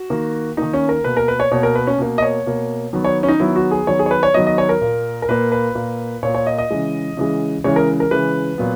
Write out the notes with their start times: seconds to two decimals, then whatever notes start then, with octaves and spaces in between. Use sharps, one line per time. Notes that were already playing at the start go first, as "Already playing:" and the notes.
Already playing: F#4
0.10 D#3 A#3
0.57 D#3 A#3 D#4
0.73 C#4
0.89 A#4
1.04 B2 A#3 B4
1.17 A#4
1.28 B4
1.40 C#5
1.52 B2 A#3 C#5
1.63 A#4
1.75 B4
1.87 C#4
1.98 B2 A#3
2.18 D#5
2.22 C#5
2.46 B2 A#3
2.93 D#3 F#3 B3
3.05 C#5
3.23 C#4
3.28 D#4
3.40 D#3 F#3 B3 E4
3.56 F#4
3.71 G#4
3.87 D#3 F#3 B3 C#5
3.99 G#4
4.06 C#5
4.11 B4
4.23 C#5
4.34 D#3 F#3 B3 D#5
4.47 D#5
4.58 C#5
4.69 A#4
4.81 A#2 A#3
5.22 A#4
5.28 A#2 A#3 B4
5.52 B4
5.75 A#2 A#3
6.23 A#2 C#5
6.27 A#3
6.35 C#5
6.47 D#5
6.58 D#5
6.70 C#3 E3 G#3
7.17 C#3 E3 G#3
7.64 C#3 E3 G#3 C#5
7.76 A#4
8.00 A#4
8.11 C#3 E3 G#3 B4
8.58 A#2 F#3 B3